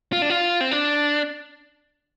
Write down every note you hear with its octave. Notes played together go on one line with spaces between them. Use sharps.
F4
D4
F4
C4
D4